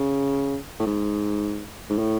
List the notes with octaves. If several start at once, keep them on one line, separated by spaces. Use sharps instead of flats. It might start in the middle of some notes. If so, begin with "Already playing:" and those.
Already playing: C#3
A2
G#2
G#2
A2